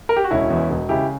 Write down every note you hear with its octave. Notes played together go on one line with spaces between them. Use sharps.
A#4
G4
F#4
E1 C#4 E4
E2
E1
C#3 E4 G4